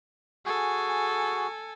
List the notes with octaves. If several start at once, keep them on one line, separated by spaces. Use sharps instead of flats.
F#4 G#4 A4 G#5